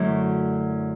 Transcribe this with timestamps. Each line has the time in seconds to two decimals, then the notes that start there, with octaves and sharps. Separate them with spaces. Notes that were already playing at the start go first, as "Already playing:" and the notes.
Already playing: F#2 D3 F#3 A3 E4 F#4